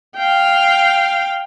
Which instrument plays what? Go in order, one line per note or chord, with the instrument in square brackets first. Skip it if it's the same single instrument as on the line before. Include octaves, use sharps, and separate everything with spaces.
[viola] F5 G5